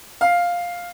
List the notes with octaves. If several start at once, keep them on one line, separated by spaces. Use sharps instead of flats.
F5